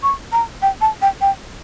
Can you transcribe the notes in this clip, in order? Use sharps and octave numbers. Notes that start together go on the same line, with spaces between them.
C#6
A#5
G5
A5
G5
G5